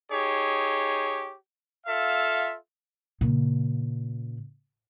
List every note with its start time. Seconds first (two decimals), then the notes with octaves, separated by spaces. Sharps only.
0.11 D#4 G4 G#4 C#5
1.86 F4 A4 E5 F5
3.21 A#2 C#3